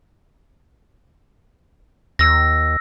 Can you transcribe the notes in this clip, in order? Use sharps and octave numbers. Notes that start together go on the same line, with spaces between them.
D#2 E6 A#6